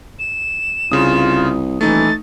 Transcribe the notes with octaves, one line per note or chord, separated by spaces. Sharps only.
E7
C2 C#3 F4 D#6
D#1 E3 A3 D#4 A6